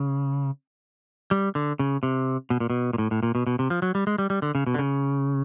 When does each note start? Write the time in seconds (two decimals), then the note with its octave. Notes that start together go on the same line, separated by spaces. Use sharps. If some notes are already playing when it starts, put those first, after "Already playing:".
Already playing: C#3
1.31 G3
1.55 D3
1.79 C#3
2.03 C3
2.50 B2
2.60 A#2
2.70 B2
2.93 A#2
2.98 A2
3.11 A2
3.23 A#2
3.35 B2
3.47 B2
3.59 C3
3.70 F3
3.82 F#3
3.95 G3
4.07 G#3
4.18 G3
4.30 G3
4.42 D3
4.55 C#3
4.67 B2
4.74 D3
4.79 C#3